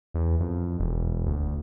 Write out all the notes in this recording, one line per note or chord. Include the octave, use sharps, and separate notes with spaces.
E2
F2
E1
D2